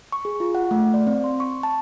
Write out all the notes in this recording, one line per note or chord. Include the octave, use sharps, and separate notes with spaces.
C#6
G#4
F4
F#5
A3
D5
C4
C6
C#6
A5